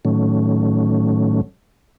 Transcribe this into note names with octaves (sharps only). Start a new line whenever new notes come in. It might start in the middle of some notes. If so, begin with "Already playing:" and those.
A2 D#3 F#3 A3 C#4